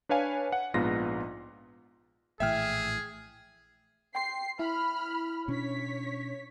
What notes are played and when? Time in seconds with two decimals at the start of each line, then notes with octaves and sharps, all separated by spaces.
0.09 D4 B4 C#5 F5 G#5
0.52 F#5
0.74 A#1 G#2 B3 D#4 F4 A#6
2.40 A#1 A2 E3 G#4 E5 G5 F6
4.15 G5 C6 C7
4.59 E4 B5 F6
5.48 B2 C#4 D4 C#5 B6